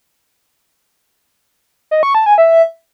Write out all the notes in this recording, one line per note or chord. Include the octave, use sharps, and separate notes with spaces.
D#5
C#6
A5
G#5
E5